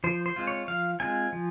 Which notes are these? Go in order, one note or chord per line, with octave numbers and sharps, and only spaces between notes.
F3 C5
C5
G#3 C4 F4
C#5
F3 F5
G#3 C4 F4 G#5
F3